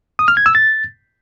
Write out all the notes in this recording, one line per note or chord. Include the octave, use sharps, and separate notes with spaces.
D#6
F6
G#6
E6
A6